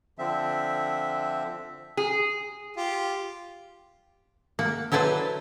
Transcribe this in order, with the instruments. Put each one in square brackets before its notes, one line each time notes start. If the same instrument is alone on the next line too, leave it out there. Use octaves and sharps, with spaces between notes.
[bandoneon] D3 F3 C4 E5
[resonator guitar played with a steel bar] G#4
[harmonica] F4 G4
[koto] A#3 F#5
F#3 E4 A4 B4 C5 D5